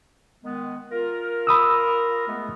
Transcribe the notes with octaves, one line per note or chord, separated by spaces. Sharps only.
D#3 G#3 B3
F4 A#4
B5 D#6 E6
G#3 A3 B3